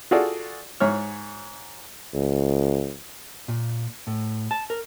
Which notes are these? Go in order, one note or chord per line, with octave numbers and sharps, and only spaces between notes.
F4 F#4 G#4 A4 D5
G#2 C#5 F6
C#2
A#2
A2
A5
A#4